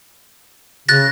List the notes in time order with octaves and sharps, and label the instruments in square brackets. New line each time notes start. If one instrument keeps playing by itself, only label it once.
[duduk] C#3 [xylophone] F#6 A6 A#6